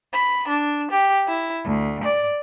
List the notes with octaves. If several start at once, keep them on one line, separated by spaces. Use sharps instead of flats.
B5
D4
G4
E4
D2
D5